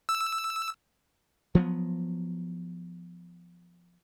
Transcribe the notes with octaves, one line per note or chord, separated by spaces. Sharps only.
E6
F3 F#3 A#3 B3